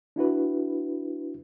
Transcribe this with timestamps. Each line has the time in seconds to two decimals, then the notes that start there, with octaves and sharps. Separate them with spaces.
0.16 D4 E4 F#4 B4